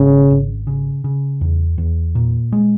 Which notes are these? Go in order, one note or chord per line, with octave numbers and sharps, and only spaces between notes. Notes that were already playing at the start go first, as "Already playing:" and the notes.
Already playing: G#1 C#3
G#1
C#3
C#3
E2
E2
A#2
G#3